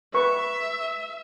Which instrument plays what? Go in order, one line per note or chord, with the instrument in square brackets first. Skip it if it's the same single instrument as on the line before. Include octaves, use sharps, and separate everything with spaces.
[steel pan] B4 C#6 [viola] E5